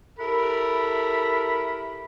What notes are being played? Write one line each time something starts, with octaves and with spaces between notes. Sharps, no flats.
E4 G4 A4 A#4 B5